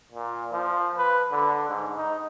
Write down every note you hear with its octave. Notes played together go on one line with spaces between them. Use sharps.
A#2
F3
B4
D3
G#2
D#4